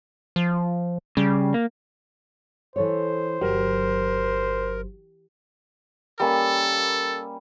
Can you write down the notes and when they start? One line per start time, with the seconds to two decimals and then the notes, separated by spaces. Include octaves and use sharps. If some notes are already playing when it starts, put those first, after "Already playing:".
0.36 F3
1.17 C#3 G3
1.54 A#3
2.76 E3 A4 C5 C#5
3.41 G1 F#3 G4 A#4
6.20 G3 A#3 C#4 A4